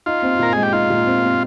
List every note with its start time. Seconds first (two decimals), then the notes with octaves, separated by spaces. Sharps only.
0.06 D#4 F4
0.22 C4
0.39 A#2 A#4
0.53 G#3 G#4
0.63 G4
0.72 D#4 F4
0.90 A#2
1.06 C4
1.23 C4